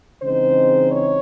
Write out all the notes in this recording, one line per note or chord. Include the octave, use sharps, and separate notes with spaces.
C#3 E3 G#3 C4 D#4 C5
C#5